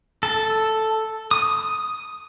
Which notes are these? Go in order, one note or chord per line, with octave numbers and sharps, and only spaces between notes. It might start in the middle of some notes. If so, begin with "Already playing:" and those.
A4
D#6